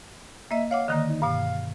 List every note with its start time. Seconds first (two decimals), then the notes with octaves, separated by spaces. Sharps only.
0.51 A#3 D#5 E5
0.71 C#5 F5 F#5 D6
0.88 D3 D#3 A#3 D#5
1.09 D#4
1.22 G2 B2 F5